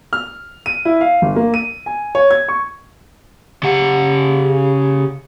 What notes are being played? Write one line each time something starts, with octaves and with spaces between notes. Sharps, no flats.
F6
D#7
E4
F5
G1
A#3
D#7
G#5
C#5
G#6
C#6
C#3 G4 F#5